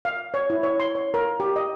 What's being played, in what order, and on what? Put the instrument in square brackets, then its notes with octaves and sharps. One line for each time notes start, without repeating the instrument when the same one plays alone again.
[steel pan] F5
C#5
E4
C#5
C6
C#5
A#4
G4
D#5